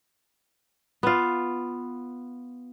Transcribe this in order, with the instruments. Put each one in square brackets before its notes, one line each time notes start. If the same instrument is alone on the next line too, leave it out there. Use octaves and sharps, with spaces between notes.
[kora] B3 F4